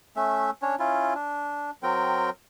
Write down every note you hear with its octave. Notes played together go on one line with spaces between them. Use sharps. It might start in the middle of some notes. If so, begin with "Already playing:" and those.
A3 C#4 E5
C#4 D4 C#5
C#4 E4 F4
D4
F#3 C4 A#4 G5